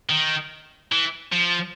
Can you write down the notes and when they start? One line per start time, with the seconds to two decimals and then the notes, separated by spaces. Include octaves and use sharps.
0.09 D#3
0.92 E3
1.33 F3